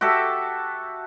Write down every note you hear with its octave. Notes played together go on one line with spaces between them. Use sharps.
F#4 G4 A4 E5